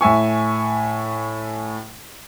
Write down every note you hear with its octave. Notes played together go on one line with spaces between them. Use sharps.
A2 E5 G#5 C#6